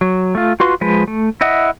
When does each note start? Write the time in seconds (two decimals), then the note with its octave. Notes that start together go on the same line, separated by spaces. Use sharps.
0.01 F#3
0.35 A3 F4
0.60 F4 F#4 B4 C6
0.81 F3 G#3 B4
1.08 A3
1.41 E4 D#5 E5 F#5